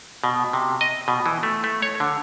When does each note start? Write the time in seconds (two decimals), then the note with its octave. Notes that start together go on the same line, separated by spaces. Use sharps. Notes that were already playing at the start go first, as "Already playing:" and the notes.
0.24 B2
0.53 C3
0.81 D#5
1.08 B2
1.26 E3
1.43 A3
1.64 A3
1.82 C#5
2.00 D3